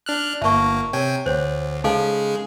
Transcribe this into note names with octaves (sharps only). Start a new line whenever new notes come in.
D4 F6 F#6
G1 A#3 E5 A5 C#6
C3 C#5 G5 G#5
D2 C5 C#5
C#3 G#3 D#4 G#4 A4 F5